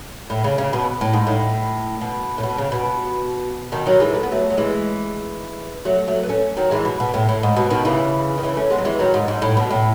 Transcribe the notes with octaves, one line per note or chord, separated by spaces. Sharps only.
A2
C#3
C#3
B2
A2
G#2
A2
B2
A2
B2
C#3
B2
B2 D#3
D#3 F#3
E3 G#3
A3
B3
F#3 A3
F#3
E3 G#3
F#3 A3
F#3 A3
B3
A3 C#4
D#3 F#3
E3 G#3
B2
B2
A2
A2
G#2
B2
B2 D#3
C#3 E3
D#3
C#3 E3
A3 C#4
G#3 B3
F#3
E3 G#3
D#3 F#3
G#2
G#2
A2
B2
A2